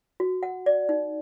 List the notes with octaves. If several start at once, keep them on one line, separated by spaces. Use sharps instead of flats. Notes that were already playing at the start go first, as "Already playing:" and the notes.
F#4
F#5
D5
D#4